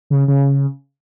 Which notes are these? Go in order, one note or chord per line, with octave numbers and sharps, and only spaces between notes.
C#3
C#3